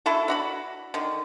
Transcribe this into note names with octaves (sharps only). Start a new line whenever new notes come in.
D4 E4 F#4 A4
D4 F#4 B5
D3 D#3